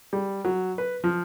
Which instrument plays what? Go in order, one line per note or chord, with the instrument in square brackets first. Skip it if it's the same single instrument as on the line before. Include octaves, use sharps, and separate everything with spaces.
[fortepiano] G3
F#3
B4
F3